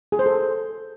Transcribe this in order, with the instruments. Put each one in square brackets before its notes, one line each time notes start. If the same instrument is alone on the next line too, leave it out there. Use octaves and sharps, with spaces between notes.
[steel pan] G#4
C5
A4